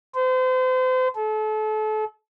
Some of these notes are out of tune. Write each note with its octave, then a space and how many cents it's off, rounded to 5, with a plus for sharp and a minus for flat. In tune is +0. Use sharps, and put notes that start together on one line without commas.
C5 -35
A4 -35